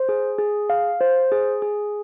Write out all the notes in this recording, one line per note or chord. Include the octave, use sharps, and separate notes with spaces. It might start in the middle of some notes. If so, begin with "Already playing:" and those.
Already playing: C5
G#4
G#4
F5
C5
G#4
G#4